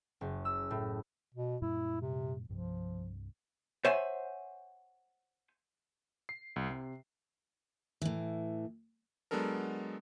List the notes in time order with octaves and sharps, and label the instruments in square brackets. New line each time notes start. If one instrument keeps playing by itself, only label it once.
[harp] F#1
E6
A2
[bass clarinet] B2
[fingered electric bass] F#2 A#2 G3 [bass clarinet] E4
[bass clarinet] C3
[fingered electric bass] C2 G2 C3 [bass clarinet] F3
[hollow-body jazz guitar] C5 C#5 E5 F#5 G#5 C6
[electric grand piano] C7
C2
C3
[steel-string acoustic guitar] A2 E3
[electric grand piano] F#3 G#3 B3 D4 A4 A#4